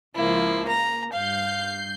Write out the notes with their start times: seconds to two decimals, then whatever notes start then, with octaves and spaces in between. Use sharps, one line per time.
0.16 C#2 F3 A#3 E4
0.68 A#3 A#5
1.13 G2 F5 G6 C7